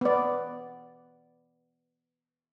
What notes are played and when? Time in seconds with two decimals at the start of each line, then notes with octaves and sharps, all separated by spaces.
0.01 B3 D5